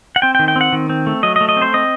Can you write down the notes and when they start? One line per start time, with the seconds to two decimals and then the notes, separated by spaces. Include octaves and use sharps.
0.16 F#5
0.22 C4 G5
0.35 G5
0.39 D#3
0.48 G5
0.56 C4
0.61 F#5
0.73 D#3
0.89 C4
1.07 A3
1.23 F#3 D#5
1.36 D#5
1.41 A3
1.49 D#5
1.57 C4 C5
1.74 C4 D#5